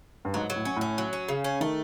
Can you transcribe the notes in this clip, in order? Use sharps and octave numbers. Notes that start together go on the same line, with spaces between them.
G2
G#2 F#3
F#3
A2
C#4
A2
C#4
F#3
C#4
C#3
C#4
D#3 A3